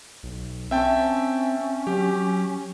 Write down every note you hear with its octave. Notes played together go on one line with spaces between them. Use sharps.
B1
C4 C#4 E5 G5 A5
F#3 G4